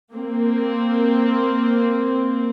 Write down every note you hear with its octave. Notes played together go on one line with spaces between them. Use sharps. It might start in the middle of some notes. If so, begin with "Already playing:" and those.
A#3 C4